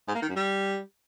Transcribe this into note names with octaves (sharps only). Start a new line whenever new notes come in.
G#2
A#3
D#3
F#2
G3